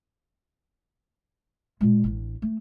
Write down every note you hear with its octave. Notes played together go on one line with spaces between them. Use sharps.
A#2 G#3
A1 D4
A3